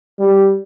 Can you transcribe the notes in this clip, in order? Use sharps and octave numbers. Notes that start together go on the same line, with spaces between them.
G3